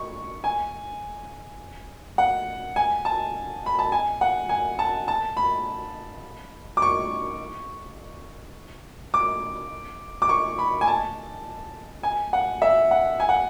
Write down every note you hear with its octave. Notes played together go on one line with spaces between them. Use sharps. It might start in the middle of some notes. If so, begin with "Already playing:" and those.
Already playing: C#6
G#5
F#5
G#5
A5
B5
A5
G#5
F#5
G#5
A5
A5
B5
D6
C#6
D6
D6
C#6
B5
G#5
A5
G#5
F#5
E5
F#5
G#5
F#5